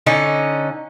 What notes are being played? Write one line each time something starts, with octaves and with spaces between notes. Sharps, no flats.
D3 C#4 D#4